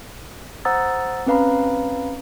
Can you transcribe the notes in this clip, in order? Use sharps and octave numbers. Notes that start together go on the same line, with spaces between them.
C5 F#5 A#5 D#6 E6 A6
C4 C#4 B4 F5 A#5 B5